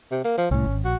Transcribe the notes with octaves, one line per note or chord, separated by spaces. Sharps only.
C3
A#3
F3
C2 A2 C#4
G#1
A#1 F#4